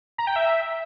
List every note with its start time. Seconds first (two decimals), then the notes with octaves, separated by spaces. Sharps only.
0.18 A#5
0.27 G5
0.36 E5